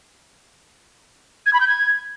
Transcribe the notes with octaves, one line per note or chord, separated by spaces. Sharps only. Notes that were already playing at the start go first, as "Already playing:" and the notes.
G#6
B5
G6
G#6